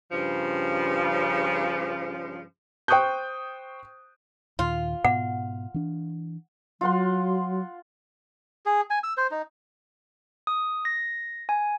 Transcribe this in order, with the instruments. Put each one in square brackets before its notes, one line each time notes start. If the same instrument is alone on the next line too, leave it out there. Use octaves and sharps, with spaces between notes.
[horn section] G2 C#3 F3
[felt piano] C5 G5 C#6 D#6 F#6 G6
[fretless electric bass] D#2 A#2 D#3 [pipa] F4
[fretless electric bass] G#2 B2 B3 [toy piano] F#5
[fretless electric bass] E3 D4
[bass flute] F#3 [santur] F4 F#5 C6
[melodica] G#4
G#5
E6
C5
D#4
[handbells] D#6
A#6
G#5